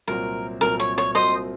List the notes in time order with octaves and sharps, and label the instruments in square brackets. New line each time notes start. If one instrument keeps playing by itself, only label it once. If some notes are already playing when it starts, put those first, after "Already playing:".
[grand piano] C2 A#2 F#3 C4 F#4 [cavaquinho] A#4
[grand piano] C2 A#2 F#3 C4 F#4 [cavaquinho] A#4
[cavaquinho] C#5
C#5
[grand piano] C2 A#2 F#3 C4 F#4 [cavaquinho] C5 D#5